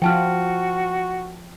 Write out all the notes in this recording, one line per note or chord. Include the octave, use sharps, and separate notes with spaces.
F3 F4 F#4 G5 A5 F6